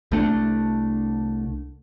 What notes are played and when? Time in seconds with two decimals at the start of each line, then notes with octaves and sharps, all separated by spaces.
0.12 C2 A3 C#4 D4